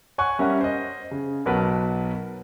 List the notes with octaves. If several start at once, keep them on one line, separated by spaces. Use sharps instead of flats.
C#5 F#5 G#5 C#6 F#6
G3 C#4 A#4 E5 F#5 F#6
C5 D#5
C#3
B1 F#3 A#4 B4 F#5 A5